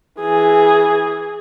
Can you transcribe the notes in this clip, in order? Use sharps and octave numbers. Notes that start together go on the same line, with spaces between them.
E3 G#4